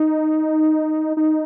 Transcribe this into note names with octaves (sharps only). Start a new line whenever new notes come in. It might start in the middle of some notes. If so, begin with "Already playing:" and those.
Already playing: D#4
D#4